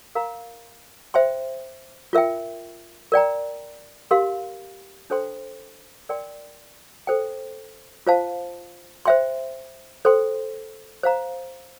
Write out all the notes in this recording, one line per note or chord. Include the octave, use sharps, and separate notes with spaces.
A#4 F5 A#5
C5 E5 G5 C6
F4 A#4 E5 G5
A#4 D5 G5 A#5
G4 A#4 F5 C6
D4 A4 C5 G5 C6
A#4 D5 G5 C6
A4 C5 G5
F4 C5 F5 A5
C5 E5 G5 C6
A4 C5 G5 C6
C5 F5 A#5